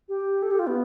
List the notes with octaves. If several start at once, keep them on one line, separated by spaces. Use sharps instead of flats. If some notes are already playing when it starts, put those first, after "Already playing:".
G4
A4
G4
F4
B3